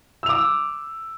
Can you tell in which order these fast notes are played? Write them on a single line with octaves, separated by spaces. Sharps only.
E6 F7 D6